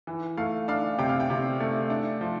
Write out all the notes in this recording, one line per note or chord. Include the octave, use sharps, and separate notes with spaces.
E3
A3 F5
D4 F5
C3 G5
F5
G5
C3
A3
D4
F3